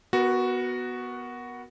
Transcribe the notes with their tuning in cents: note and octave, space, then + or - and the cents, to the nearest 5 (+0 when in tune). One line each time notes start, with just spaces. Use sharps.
B3 +0 F#4 +0 A#4 +25